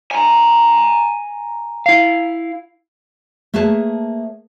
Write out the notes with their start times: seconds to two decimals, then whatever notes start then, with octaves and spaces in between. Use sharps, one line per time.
0.11 G#5 A#5
1.86 E4 F5
3.54 A3 A#3 G#4 B4 C#5 A5